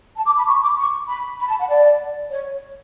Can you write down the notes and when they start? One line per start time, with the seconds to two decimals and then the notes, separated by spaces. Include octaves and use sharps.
0.16 A5
0.26 D6
0.37 B5
0.47 C#6
0.62 D6
0.78 C#6
1.08 B5
1.39 B5
1.49 A5
1.59 F#5
1.69 D5
2.30 C#5